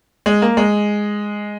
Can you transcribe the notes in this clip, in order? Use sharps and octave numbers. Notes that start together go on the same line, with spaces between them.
G#3
A#3
G#3